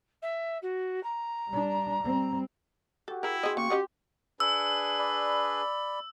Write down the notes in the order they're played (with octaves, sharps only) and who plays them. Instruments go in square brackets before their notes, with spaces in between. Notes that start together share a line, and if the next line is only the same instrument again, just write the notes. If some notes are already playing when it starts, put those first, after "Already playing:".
[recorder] E5
F#4
A#5
[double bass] G3 D4
G3 C4
[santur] F#4 G4 [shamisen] A4
[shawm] E4 [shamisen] G#4 A#4
[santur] C4 [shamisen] G#4 D#5
[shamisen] C#3 [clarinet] A#3 [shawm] C#6
[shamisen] C#4 D#5 F#5 [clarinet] G4
[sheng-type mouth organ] D4 G#4 B4 [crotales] E6
[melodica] D5 B5